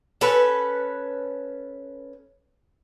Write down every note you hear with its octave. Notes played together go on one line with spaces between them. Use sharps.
C#4 A4 B4